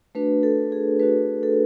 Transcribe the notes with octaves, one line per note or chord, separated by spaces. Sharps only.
A3 D4 F#4 B4
A4
G#4
A3 D4 F#4 B4
A4